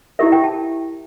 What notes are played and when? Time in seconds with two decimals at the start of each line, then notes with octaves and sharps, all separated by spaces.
0.19 E4 G4 A#4 E5
0.32 G5
0.44 A5